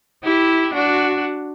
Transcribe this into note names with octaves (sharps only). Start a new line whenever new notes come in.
E4 G4
D4 F#4